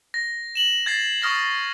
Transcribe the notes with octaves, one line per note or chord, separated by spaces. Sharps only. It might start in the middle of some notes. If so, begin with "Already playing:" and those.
A#6
E7 F#7
G#6 A6 C7
C#6 D#6 F6 A#6 F#7